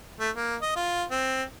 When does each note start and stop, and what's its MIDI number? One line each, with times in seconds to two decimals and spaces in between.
0.20 0.30 57
0.36 0.56 58
0.61 0.71 75
0.76 1.03 65
1.10 1.43 60